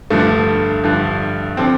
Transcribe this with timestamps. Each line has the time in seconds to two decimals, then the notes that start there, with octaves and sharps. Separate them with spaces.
0.10 G2 D3 F3 A3
0.84 G2 D3 F3
1.57 D3 F3 C4